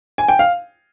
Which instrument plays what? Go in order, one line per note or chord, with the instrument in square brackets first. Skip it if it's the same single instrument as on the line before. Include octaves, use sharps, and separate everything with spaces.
[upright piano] G#5
G5
F5